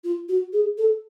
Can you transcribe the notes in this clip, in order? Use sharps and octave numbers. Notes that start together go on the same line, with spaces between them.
F4
F#4
G#4
A4